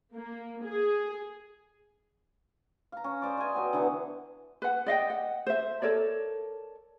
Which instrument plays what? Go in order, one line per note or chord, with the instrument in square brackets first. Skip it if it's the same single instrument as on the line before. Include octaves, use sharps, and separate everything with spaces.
[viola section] A#3
G#4
[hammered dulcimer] F5 A#5
C#4
G#4 C5 D5
D#5 E5 G#5
F#3 B3 G4
D3 E3 B3
[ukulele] B4 F#5
D5 D#5 F5 G5
F#5
C5 E5
A4 A#4 C#5 D5